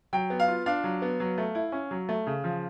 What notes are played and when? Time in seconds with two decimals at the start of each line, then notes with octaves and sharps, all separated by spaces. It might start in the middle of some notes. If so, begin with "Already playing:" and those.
0.13 F#3 G5
0.30 B3
0.40 F5
0.48 F4
0.66 D4 F5
0.84 F#3
1.02 B3
1.20 F#3
1.38 A3
1.55 E4
1.72 C#4
1.91 F#3
2.09 A3
2.27 C#3
2.44 F3